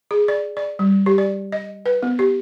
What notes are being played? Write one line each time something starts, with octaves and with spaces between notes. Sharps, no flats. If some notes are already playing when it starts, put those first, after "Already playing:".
G#4
D5
D5
G3
G4
D5
D#5
B4
B3
G4